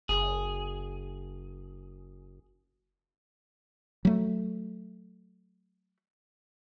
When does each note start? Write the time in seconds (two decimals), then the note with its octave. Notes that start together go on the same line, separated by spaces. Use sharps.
0.09 F#1 G#4
4.05 F#3 A3